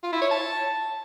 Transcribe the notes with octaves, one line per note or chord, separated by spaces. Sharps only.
F4
E4
C#5
A5